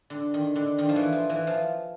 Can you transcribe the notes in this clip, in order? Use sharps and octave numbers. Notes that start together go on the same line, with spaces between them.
D3
D#3
D3
D#3
F3
E3
F3
E3
F3